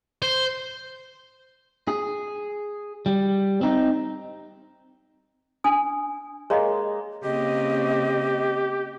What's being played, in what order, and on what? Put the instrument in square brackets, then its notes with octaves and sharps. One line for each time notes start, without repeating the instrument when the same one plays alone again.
[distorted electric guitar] C5
[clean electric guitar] G#4
G3
C4 D#4
[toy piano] D4 G#5 D#6
[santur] G#3 A#3 [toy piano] C#5 D#5
[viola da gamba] C#3 A#3 C4 [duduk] G4 [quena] D#5